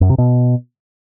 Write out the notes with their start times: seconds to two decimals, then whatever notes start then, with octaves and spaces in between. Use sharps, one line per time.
0.01 F#2
0.10 C3
0.18 B2